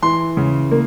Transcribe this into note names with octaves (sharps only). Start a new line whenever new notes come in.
E3 C6
C#3
A#3